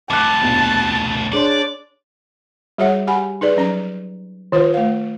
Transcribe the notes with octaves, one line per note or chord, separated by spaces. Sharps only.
F2 A2 A5 D6 F#6
A#1 D#2 B2
D4 G#4 C#5 D5 C6
G3 F#4 G#4 C#5 E5 F#5
G4 F#5 G#5 B5
D#4 G#4 B4 D5
F3 F#3 C#4 A#5
D#3 F4 B4 C5
A3 F5